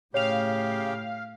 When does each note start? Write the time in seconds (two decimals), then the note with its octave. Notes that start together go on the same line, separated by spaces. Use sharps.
0.14 A2 C#3 G4 C#5 F5 F7